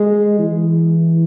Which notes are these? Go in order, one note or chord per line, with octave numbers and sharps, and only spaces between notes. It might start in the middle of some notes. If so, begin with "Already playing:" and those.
Already playing: G#3
E3